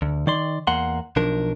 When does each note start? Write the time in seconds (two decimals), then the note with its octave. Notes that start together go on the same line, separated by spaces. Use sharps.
0.02 D2
0.27 D#3 D5 C6
0.67 E2 A#3 F#5 C6
1.16 B1 F3 D4 A#4